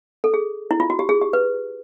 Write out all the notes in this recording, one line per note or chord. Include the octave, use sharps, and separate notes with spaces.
A4
G#4
E4
F4
F#4
G4
G#4
G4
B4